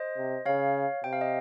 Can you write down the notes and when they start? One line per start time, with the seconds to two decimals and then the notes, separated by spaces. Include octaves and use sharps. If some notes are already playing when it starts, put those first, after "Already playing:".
Already playing: C5 D#5
0.17 C3
0.46 C#3 C#5 F5
1.04 C3 G5
1.13 F5
1.21 D#5